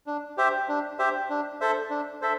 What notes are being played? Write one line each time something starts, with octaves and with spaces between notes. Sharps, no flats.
D4
G4 C5 E5
D4
G4 C5 E5
D4
A4 C5 E5
D4
A4 C5 E5